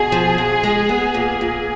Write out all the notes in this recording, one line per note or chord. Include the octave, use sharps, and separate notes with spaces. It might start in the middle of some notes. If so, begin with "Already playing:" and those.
Already playing: B2 G#4
F3
F2
G#3
B3
A#2
A#2